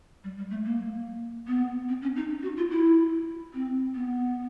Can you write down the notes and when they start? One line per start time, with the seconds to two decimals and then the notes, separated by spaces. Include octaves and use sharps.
0.24 G3
0.37 G3
0.50 A3
0.65 A#3
1.47 B3
1.89 C4
2.02 C#4
2.16 D#4
2.43 F#4
2.57 F4
2.71 E4
3.54 C4
3.95 B3